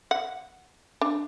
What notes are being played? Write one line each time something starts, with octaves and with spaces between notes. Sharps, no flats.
F#5
D4